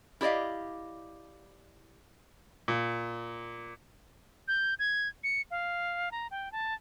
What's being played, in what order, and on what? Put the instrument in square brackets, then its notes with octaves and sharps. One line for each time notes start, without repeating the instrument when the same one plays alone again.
[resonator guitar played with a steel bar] E4 G4 D5 D#5 F5
[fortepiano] A#2
[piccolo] G6
G#6
C#7
F5
A#5
G5
A5